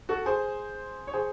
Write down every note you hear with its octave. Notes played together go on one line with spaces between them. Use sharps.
F#4 A4
G#4 C5
C#5
G#4 C5